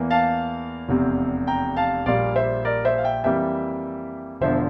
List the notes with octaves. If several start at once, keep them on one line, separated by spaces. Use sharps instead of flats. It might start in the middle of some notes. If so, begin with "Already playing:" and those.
Already playing: E2 E3 A#3
F5 A5
F1 E2 C3
G5 A#5
F5 A5
A#1 A#2 G3 A#3 D5 F5
C5 E5
A#4 D5
C5 E5
F5
E5 G5
F2 E3 G3 A#3 E5 G5
E1 E2 D3 F3 C5 E5